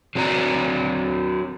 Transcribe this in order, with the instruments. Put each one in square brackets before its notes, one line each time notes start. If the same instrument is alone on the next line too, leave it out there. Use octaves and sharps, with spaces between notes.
[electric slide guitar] F#3 C4 F#4 D5 A#5